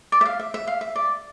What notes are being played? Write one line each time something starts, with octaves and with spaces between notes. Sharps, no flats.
D5
E5
F5
E5
E5
F5
E5
D5